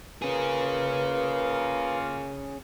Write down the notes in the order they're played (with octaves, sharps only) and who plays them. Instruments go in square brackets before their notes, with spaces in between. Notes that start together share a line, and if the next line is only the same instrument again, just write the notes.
[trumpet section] A#3 F4 A#4 [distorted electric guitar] C#4 G#4 [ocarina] B4